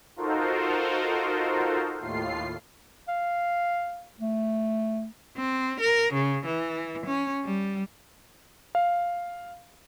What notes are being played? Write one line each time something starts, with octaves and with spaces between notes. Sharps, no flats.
D#4 F4 F#4 A4 A#4 C5
D#2 A2 F4 C7
F5
A3
C4
A#4
C#3
E3
C#4
G3
F5